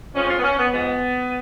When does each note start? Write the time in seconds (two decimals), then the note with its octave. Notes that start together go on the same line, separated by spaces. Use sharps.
0.15 F2 F3 G#3 C#4
0.30 F4
0.39 B3
0.43 C#4
0.59 B3
0.72 G#2 F3 G#3 B3